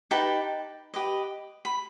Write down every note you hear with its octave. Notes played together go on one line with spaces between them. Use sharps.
D#4 G4 B4 G5 A5
G4 B4 D#5
B5